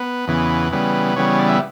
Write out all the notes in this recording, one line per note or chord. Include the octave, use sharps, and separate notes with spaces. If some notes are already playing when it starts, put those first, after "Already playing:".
Already playing: B3 B4
E2 C#3 E3 B3
C#3 E3 G3 B3
C#3 E3 G3 B3 C#5
D5
E5